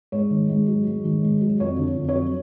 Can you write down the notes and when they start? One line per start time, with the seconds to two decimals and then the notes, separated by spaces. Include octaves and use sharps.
0.12 G#2 C#5
0.31 D#3
0.49 G#2
0.68 F#3
0.87 G#2
1.04 D#3
1.23 G#2
1.41 F#3
1.60 F2 C#5
1.79 D3
1.96 F2
2.09 C#5
2.15 F#3